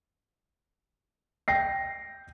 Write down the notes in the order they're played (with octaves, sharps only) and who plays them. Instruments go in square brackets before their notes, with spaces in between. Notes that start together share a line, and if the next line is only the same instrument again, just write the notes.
[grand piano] G5 A#6 C7